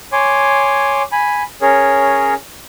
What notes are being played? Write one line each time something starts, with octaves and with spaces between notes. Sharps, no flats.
C#5 G#5 C6 D6
G#5 B5
C#4 G#4 A#4 C#5